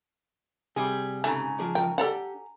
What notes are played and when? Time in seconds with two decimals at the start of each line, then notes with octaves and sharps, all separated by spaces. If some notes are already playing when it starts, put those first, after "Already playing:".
0.76 C3 G3 G#4
1.24 G#2 C#3 A3 G#5 A#5
1.59 F3 G#4 D5
1.75 F3 A#4 F#5 G5
1.98 D4 G4 A4 D5 F#5